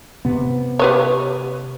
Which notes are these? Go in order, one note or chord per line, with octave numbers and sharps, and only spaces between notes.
C3 B3
G4 B4 C#5